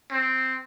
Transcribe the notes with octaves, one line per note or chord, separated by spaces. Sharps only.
C4